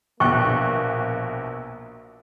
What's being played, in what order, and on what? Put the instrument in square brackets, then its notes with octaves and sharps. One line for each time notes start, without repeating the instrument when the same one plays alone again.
[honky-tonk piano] A#1 B2 F#6 [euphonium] A#3 [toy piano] G5 C#6